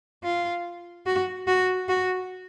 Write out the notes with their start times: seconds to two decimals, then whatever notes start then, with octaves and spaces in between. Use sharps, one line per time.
0.23 F4
1.06 F#4
1.47 F#4
1.89 F#4